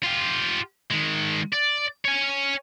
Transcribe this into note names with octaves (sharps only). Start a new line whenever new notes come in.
F4 G4
D#3 G#3
D5
C#5 G#5